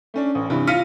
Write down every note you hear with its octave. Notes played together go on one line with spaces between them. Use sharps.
A3 C#4 D4
A1
G2 C3 E3
F4 F6 A#6 B6 C#7 D#7